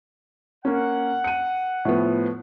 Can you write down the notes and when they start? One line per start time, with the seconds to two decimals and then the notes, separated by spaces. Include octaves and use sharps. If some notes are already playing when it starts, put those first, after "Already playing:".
0.65 A#3 C#4 F#5
1.24 C#7 D#7
1.85 A2 F3 B3